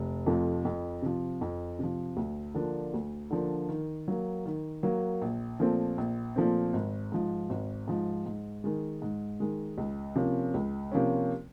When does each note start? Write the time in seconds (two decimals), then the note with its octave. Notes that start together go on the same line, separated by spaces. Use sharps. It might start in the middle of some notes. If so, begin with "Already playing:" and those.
Already playing: F1
0.26 F2 C3 F3 A3
0.65 F2
1.02 C3 F3
1.41 F2
1.79 C3 F3
2.17 D2
2.54 D3 F3 A#3 D4
2.94 D2
3.31 D3 F3 A#3 D4
3.69 D#3
4.08 F#3 A#3
4.46 D#3
4.83 F#3 A#3
5.22 A#1
5.59 A#2 F3 A3 C4
5.98 A#1
6.36 A#2 F3 A3 C4
6.73 G#1
7.12 G#2 F3
7.50 G#1
7.88 G#2 F3
8.26 G#2
8.64 D#3 G#3
9.02 G#2
9.40 D#3 G#3
9.78 C#2
10.16 C3 F3 A#3 C#4
10.54 C#2
10.92 C3 F3 A#3 C#4